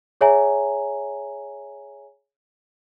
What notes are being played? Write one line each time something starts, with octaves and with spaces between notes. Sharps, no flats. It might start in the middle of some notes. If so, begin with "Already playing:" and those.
G#4 C#5 E5 G#5 A#5